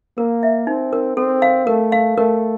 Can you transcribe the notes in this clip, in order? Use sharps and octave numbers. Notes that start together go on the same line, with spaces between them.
A#3 A#4
E5
C4 D#4
A#4
C4 A4
F5
A3 A#4
F5
A3 A#4